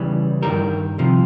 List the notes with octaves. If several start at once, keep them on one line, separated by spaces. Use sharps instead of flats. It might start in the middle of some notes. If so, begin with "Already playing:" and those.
Already playing: E2 C#3 E3 G3
G2 D#3 G3 A#4
C2 C3 F3